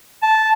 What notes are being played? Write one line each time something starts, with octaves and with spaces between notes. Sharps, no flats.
A5